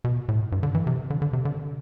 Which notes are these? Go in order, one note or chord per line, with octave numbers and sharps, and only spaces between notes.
B2
A2
G2
D3
E3
C3
D3
D3
C3
D3